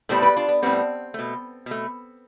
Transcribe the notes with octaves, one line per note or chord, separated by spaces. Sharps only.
A2 G3 B3 A4 C5
G4 B4
D4 F4
B3
A2 G3 B3 C4
B2 A3
B2 A3